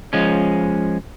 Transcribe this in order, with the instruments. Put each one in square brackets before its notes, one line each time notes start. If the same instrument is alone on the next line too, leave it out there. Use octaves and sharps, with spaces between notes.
[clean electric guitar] F3 G#3 C#4